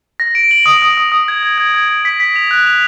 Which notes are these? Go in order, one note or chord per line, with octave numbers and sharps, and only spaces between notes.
A#6
D7
F#7
D#6
D#6
D#6
D#6
G#6
G#6
G#6
G#6
G#6
B6
B6
F7
F#6
F7